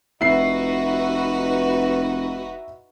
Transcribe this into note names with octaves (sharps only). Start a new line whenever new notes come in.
F1 D#4 E4 F#4 B4 C7